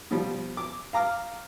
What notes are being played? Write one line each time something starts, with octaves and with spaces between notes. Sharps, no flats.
B2 F3 G3
D6
F5 A#5 D6 F6